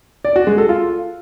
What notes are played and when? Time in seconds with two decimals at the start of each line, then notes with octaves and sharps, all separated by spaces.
0.25 D5
0.36 F#4
0.47 G#3
0.58 A4
0.69 F4